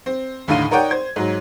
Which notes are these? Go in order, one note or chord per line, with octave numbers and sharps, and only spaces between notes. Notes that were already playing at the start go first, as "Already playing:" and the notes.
C4
D#2 A2 D3 D#4 F5 D#7
D#4 A#4 C#5 D5 F#5 G5
C5 G#6
G#2 F#3